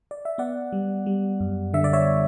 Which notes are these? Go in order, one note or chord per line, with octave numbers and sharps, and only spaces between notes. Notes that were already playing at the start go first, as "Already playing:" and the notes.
D5
E5
B3 D5 F#5
G3
G3
F#2
D3 E5
D5
C#5 E5